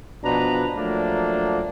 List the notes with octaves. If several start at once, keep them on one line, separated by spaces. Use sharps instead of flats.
B2 F3 D4 B4 A#5
F3 F#3 A3 A#3 D4